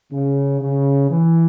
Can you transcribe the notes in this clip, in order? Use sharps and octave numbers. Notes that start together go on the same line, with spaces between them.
C#3
C#3
E3